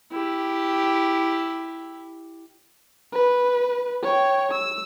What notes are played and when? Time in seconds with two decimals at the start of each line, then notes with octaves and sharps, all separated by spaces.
0.12 E4 G4
3.12 B4
4.03 C#5 G5
4.51 E6